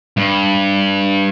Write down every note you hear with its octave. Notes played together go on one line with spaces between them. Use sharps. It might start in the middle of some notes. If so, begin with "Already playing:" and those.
G2